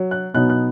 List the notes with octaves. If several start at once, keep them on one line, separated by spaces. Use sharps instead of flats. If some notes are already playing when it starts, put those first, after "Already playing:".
Already playing: F#3
F#6
B2 F#3 B3 D#4 F#6
F#6